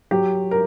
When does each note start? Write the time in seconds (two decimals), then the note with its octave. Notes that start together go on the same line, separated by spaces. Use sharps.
0.11 F#3 G4
0.51 A#4